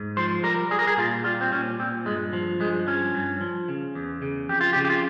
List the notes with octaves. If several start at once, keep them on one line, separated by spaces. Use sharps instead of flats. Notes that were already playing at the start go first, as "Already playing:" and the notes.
Already playing: G#2
F3 C5
G3 A#4
G3 G#4
A#4
G#4
A#2 F4
G3 F4
C4
A#2 C#4
A#2 C4
G2 G#3
F3
G2 G#3
F3 C#4
G2
F3
C#3
E2
C#3
F2 G4
F4
G4
C#3
G4
F4